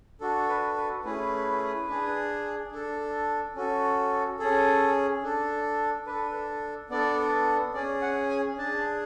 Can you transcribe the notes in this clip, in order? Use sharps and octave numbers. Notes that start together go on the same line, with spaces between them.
D4 F#4 A4
B4
B4
A3 C#4 E4 G#4 B4
D4 G#4
D4 A4
C#4 F#4 A4
C#4 G#4 A4
D4 A4
D4 A4 B4
B3 D4 A4 D5
C#4 G#4 D5
F#5
G#5
D4 G#4 A5